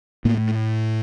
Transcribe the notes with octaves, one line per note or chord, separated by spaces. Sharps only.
A2 A#3
A3